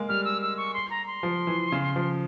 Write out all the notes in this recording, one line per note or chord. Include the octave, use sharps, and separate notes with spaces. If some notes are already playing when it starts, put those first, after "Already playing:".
Already playing: G#3 A#3
G3 F6
E6
E6
C#6
C6
A#5
C6
F3
E3
C#3
F3